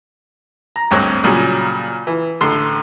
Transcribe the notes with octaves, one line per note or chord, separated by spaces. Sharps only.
A#5
G#1 D2 G2 C4 C#5 F#6
A#2 C#3 F#3 G3
E3
A1 D3 C6